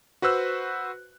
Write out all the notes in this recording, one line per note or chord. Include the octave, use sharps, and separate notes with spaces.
F#4 B4 C5 E6 F#6